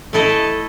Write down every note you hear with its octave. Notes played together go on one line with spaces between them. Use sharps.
A3 E4 A4 D#5